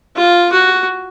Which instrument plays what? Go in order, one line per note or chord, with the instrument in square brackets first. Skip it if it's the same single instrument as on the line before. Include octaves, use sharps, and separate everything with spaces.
[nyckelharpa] F4
F#4